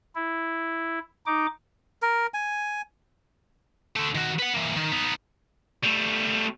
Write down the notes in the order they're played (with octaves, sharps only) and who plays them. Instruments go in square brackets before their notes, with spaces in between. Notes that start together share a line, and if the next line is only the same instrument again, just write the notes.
[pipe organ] E4
D#4 D6
[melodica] A#4
G#5
[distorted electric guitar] D3 A3
D#3 F#4
B4 F#5
E3 A#3
D#3
B3 D#4
G3 A3